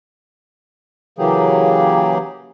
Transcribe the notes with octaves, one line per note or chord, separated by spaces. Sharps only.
C#3 E3 F#3 A#3 G4 G#4